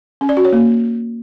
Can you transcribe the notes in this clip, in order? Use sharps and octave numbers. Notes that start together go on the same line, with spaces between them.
C#4
D5
F#4
C#5
A#3